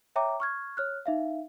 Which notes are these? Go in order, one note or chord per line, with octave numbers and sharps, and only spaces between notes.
C#5 E5 G5 A#5 D6
C#6 F6 G#6
C#5 F6 F#6
D#4 E5 F5